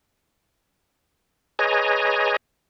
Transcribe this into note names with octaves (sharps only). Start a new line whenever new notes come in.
G#4 B4 C#5 D#5 G#5 A#5